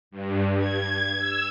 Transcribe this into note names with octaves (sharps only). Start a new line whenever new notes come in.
G2
G#6
E6